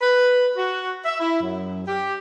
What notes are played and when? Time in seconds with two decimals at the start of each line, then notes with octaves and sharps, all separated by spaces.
0.01 B4
0.57 F#4
1.05 E5
1.19 E4
1.41 F#2
1.86 G4